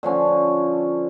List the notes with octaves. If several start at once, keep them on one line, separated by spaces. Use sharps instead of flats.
D3 F3 C#4 F4